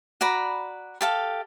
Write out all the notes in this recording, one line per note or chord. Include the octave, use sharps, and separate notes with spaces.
F#4 D5 A#5 B5
G4 A4 F5